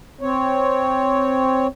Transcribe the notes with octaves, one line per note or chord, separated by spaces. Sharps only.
C4 C#5